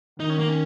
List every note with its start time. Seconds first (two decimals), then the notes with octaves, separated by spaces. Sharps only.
0.20 D#3 D#4
0.30 C#4
0.39 A#3
0.49 C#4